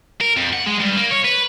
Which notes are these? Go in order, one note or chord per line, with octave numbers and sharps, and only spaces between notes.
A#4
F2
F#5
G#3
G2
A#3
C#5
B4